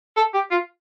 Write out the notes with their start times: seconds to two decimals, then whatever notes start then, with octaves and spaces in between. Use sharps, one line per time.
0.17 A4
0.34 G4
0.51 F4